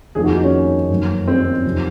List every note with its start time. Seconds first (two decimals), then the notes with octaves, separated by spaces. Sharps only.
0.15 F1 F2 D#3 A#3 G#4
0.24 F#4
0.34 D#4
0.44 C#4
0.90 F#2 D#3 A#3
1.28 C4
1.65 F2 C3 D#3